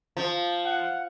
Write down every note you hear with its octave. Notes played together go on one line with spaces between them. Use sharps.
F3
F#5